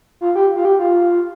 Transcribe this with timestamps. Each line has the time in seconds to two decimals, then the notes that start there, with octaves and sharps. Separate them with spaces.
0.21 F4
0.35 G4
0.56 F4
0.65 G4
0.79 F4